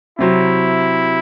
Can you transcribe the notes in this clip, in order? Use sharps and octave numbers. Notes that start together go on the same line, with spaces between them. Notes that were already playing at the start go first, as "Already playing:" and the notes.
C3 F#3 C4 E4